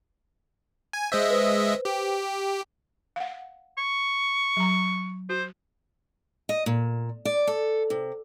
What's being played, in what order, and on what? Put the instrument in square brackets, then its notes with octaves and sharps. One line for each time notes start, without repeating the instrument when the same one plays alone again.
[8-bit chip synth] G#5
[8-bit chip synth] G#3 D#5 E5 [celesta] C5 D#6 G6
[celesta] B4 C5
[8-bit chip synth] G4
[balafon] F5 F#5
[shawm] C#6
[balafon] F#3 A#5
[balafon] F#4 [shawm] C5
[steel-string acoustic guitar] D#5
A#2
D5
A4
C3